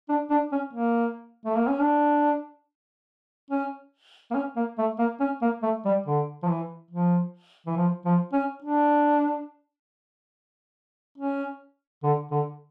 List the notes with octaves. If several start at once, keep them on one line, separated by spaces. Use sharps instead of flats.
D4
D4
C#4
A#3
A3
A#3
C#4
D4
C#4
A#3
C#4
A#3
A3
A#3
C#4
A#3
A3
G3
D3
F3
E3
F3
E3
F3
F3
C#4
D4
C#4
D3
D3